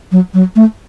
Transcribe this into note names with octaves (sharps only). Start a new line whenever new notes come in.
F#3
F#3
A3